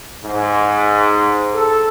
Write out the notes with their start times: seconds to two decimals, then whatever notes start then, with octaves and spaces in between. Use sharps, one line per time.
0.23 G#2
1.55 A4